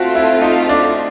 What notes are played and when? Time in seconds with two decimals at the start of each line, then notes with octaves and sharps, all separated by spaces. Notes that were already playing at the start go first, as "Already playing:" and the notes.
Already playing: A3 C4 F4 F#4
0.15 E4
0.42 D#4
0.69 D4